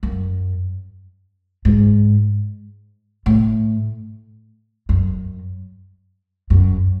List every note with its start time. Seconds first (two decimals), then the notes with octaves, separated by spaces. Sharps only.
0.03 F#2
1.65 G#2
3.26 A2
4.89 F#2
6.50 F#2